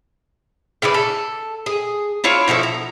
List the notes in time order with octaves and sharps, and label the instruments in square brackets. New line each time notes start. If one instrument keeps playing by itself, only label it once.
[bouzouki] C#3 E4 B4 D5
A4
G#4
D4 E4 F4 C#5
B2 F3 E4 A4
A#5